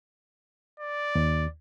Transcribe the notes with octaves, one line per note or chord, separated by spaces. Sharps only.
D5
D#2